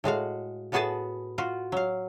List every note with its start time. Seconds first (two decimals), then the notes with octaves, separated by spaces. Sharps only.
0.04 A2 G#3 F#4 F5
0.72 A2 B3 F#4 G#4 B4 A5
1.38 F4 F#4
1.72 F#3 F5